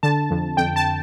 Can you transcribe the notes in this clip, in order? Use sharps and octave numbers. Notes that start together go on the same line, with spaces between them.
D3 A5
F2
F2 G5
A5